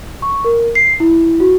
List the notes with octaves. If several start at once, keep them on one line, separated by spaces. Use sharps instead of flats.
C#6
A#4
C7
E4
F#4